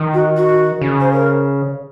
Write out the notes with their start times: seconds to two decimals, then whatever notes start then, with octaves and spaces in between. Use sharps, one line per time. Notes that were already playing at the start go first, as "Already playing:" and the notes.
Already playing: D#3
0.14 F#4
0.37 F#4
0.81 C#3
1.00 C5
1.12 A#4